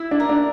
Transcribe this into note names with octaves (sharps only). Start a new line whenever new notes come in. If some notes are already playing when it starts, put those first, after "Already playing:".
Already playing: E4
D4
A#4
D4